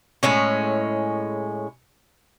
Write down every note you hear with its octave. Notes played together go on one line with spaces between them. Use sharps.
A2 G#3 C#4